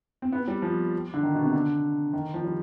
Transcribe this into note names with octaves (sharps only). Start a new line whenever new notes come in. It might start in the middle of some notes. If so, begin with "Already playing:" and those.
C4
B3
G3
F3
D3
D#3
B2
C3
D3
D#3
F3
G3